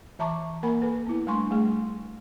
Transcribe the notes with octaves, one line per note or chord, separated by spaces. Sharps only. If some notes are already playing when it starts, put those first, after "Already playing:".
E3 E5 A5 A#5 C#6 D6
A#3 A#4 F#5 G#5 B5
A4 B4
B3 E4
G3 A3 D4 G#5 C6 C#6
G3 A3 G#4